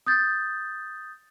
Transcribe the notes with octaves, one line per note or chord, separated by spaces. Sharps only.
D#6 G6 A6